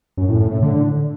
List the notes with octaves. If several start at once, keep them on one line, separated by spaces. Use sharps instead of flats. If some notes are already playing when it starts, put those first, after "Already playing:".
F#2
A2
A2
A2
D3